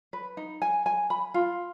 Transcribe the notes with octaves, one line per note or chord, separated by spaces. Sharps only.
B4
D#4
G#5
G#5
B5
F4